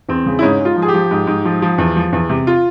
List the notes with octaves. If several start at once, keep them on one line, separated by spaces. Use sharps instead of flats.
E2 C4
C#3
E4
G#2 C#4
G#2 F4
F3
G#4
G4
F3
G#2
G#2
F3
F3
E2
F3
E2
C3
F4